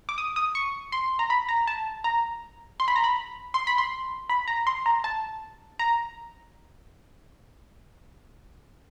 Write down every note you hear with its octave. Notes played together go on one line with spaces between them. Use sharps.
D6
D#6
D#6
C#6
C6
A#5
B5
A#5
A5
A#5
C6
B5
A#5
B5
C6
B5
C6
B5
A#5
C6
A#5
A5
A#5